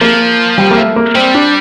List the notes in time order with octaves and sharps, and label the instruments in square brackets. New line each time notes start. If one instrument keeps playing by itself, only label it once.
[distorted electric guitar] F3 [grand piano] A#3
[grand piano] G3
A#3
A3
A#3
[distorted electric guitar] G3 [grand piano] C4
[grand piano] D4